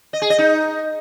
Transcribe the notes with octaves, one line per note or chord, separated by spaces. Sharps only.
D#5
G#4
D#5
D#4